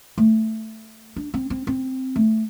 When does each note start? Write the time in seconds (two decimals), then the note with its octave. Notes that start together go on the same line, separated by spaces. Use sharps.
0.18 A3
1.16 D4
1.34 C4
1.50 C4
1.67 C4
2.16 A3